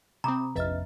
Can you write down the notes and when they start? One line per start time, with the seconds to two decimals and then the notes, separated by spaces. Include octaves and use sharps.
0.24 C3 C4 A#5 B5 D6 D#6
0.56 F1 A#1 B4 D#5 E5 F6 A6